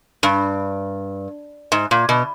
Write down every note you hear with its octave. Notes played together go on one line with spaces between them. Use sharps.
G2
G#2
A#2
B2